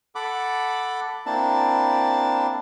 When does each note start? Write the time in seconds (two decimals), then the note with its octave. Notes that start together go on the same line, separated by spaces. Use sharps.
0.15 A4 F#5 B5 D6
1.26 A#3 C4 D4 E4 A5